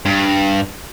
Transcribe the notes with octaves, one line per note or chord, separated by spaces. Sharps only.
G2